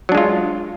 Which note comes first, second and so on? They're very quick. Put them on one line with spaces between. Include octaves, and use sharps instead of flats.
F#3 D4 G#3 F4